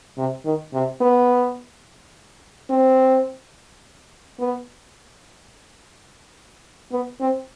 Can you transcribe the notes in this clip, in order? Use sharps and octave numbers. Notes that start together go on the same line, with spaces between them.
C3
D#3
C3
B3
C4
B3
B3
C4